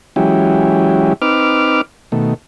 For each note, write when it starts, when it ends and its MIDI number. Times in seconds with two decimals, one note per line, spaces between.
0.16 1.13 52
0.16 1.13 54
0.16 1.13 56
0.16 1.13 61
0.16 1.13 64
0.16 1.13 67
1.22 1.81 60
1.22 1.81 63
1.22 1.81 71
1.22 1.81 86
1.22 1.81 89
2.12 2.34 47
2.12 2.34 51
2.12 2.34 57